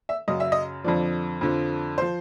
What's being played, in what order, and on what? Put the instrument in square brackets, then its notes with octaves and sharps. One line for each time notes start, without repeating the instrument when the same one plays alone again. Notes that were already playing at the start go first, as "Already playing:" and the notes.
[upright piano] E5
F#2 C#3 F#3 D#5
E5
D#5
F2 D3 F3 D5
F2 D3 F3
F3 C5